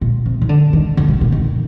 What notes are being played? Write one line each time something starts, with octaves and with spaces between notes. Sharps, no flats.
A#2
C3
D#3
D3
D#3
D3
C3
A#2
D#3